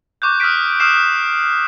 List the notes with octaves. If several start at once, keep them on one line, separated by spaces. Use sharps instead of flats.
C#6 D6 F#6 G6
D#6 F6 F#6 B6 D7
D#6 F6 C7 E7